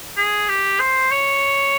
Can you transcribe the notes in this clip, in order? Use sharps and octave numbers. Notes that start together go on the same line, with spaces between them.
G#4
G4
C5
C#5